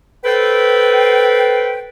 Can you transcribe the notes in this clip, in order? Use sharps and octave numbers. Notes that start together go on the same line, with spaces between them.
A4 B4 C5 G5